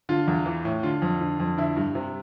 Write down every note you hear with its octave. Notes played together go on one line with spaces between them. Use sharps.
D3 F4
E2
E3
A2
D3 F4
F2
D3
F2
D3 E4
G2
C3